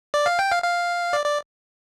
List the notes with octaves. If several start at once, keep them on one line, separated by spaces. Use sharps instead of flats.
D5
F5
G5
F5
F5
D5
D5